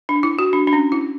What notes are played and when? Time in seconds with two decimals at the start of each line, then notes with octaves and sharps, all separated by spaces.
0.09 D4
0.23 E4
0.39 F#4
0.53 D4
0.67 D4
0.73 C#4
0.92 E4